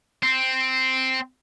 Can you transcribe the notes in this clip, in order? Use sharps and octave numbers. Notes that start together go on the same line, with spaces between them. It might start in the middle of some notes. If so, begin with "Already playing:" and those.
C4